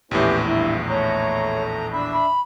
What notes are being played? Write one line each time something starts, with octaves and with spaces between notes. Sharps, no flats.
A#1 E2 A2 B3 C#4 E4 G4
G2 E4
A3 C#5 A#5
D4 E5 B5
B5